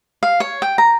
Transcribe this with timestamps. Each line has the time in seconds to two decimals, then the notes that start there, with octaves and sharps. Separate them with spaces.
0.23 F5
0.40 C#5
0.62 G5
0.78 A#5